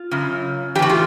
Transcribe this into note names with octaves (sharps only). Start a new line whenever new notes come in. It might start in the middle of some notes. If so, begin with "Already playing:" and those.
Already playing: F4
F#2 C#3
A2 E3 F#4 G4
F4